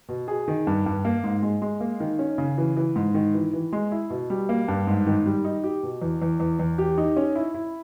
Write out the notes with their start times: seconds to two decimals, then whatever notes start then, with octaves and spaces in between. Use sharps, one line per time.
0.09 B2
0.28 G#4
0.48 D#3
0.67 G2
0.86 G2
1.05 A#3
1.24 G#2
1.43 G#3
1.62 G#3
1.80 A#3
2.00 D#3
2.19 C#4
2.38 C#3
2.58 E3
2.77 E3
2.96 G#2
3.14 D#3
3.34 E3
3.53 E3
3.73 G#3
3.92 E4
4.10 B2
4.30 G3
4.49 A#3
4.68 G2
4.87 G#2
5.07 D#3
5.26 G3
5.44 D#4
5.64 G4
5.83 B2
6.02 E2
6.22 E2
6.40 E2
6.59 E2
6.78 G4
6.98 D#4
7.17 C#4
7.36 E4
7.54 E4